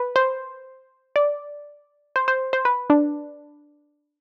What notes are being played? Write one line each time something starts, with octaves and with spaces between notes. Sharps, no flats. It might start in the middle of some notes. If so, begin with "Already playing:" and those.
Already playing: B4
C5
D5
C5
C5
C5
B4
D4